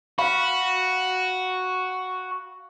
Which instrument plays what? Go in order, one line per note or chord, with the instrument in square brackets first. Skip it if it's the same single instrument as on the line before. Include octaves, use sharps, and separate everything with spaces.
[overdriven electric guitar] F#4 [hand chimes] F5 B5